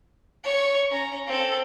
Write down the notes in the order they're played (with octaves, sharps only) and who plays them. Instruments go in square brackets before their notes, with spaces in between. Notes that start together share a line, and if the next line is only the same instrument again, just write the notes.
[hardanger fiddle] C#5 C#6
C#4 A#5
C4 A4